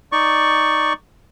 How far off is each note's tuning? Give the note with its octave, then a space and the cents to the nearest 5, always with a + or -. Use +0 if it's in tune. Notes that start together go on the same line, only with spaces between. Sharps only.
D#4 +0 D5 +0 C#6 +0